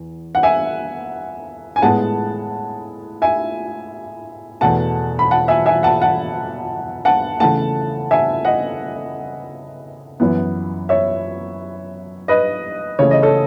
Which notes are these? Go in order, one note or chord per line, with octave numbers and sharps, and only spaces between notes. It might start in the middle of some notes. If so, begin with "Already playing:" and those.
Already playing: E2
F#5
E5 G#5
G#5
A2 G#3 B3 F#5 A5
E5 G#5
E2 B2 A3 F#5 A5
B5
F#5 A5
E5 G#5
E5 G#5
F#5 A5
F#5 A5
F#5 A5
C#3 E3 A3 F#5 A5
E5 G#5
D#5 F#5
F#2 E3 B3
C#5 E5
B4 D#5
C#3 E3 A3 C#5
D#5
A4 C#5